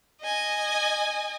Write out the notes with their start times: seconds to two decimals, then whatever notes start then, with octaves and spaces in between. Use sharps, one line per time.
0.22 D#5 G#5